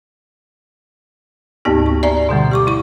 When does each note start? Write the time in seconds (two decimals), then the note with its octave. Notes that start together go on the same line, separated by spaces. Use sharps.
1.65 D2 G#2 A#3 B3 D#4 G4
1.86 C#6
2.03 D5 E5 G#5 A#5
2.29 B2 D3 G3 A3
2.51 G4 C#6 D6
2.67 E4 C#6